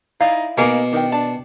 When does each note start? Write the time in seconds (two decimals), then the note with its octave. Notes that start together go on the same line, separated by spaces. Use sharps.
0.21 D#4 E4 D5 F5
0.58 B2 A#3 D#4 F#4 G#5
0.93 D#3 D4 G5
1.12 D4 A5